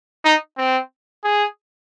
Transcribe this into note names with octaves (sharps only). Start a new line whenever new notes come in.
D#4
C4
G#4